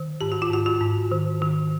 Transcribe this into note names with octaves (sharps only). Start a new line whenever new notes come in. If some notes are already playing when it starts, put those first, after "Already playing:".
Already playing: D#3
G#2 G4
F#4
F4
G#2 F#4
F#4
G#2
D#3
D#3